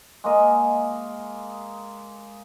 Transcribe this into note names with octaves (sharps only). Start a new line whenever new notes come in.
G#3 A#3 D#5